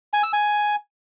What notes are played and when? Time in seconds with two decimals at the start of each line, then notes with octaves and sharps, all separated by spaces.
0.13 G#5
0.23 E6
0.33 G#5